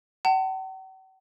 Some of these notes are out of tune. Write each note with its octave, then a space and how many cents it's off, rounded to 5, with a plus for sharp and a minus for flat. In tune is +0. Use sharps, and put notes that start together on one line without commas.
F#5 +45 A5 +40